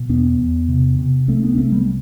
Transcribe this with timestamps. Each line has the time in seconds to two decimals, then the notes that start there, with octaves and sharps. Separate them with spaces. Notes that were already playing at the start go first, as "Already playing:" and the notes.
Already playing: B2
0.09 E2 B3 D4
0.39 E2
0.68 C3
0.99 C3
1.28 C2 A3 C4
1.43 B3 D4
1.57 C2 A3 C4
1.72 G3 B3